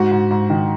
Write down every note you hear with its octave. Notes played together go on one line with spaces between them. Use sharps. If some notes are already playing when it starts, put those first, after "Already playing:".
Already playing: G#2 F#4
G#2
G#2
D#3